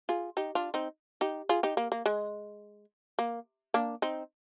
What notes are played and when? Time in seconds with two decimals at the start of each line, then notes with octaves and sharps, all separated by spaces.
0.09 F4 G#4
0.37 D#4 G4
0.55 D4 F4
0.74 C4 D#4
1.21 D#4 G4
1.49 F4 G#4
1.63 D#4 G4
1.77 A#3
1.92 A#3
2.06 G#3
3.19 A#3
3.74 A#3 D4
4.02 C4 D#4